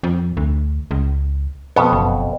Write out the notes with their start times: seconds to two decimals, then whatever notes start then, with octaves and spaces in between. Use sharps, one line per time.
0.03 F2
0.37 D2
0.91 C#2
1.76 F2 B2 B3
1.93 F#1